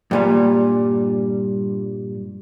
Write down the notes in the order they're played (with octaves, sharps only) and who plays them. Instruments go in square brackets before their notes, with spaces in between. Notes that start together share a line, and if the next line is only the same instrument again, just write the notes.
[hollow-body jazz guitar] G2 A#2 G3